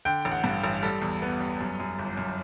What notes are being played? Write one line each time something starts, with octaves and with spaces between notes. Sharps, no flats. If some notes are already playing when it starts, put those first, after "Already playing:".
D3 G5
A1
F#5
G2
A1
G3 A4
E2
B3
G3
F#2
F#2
G1
F#2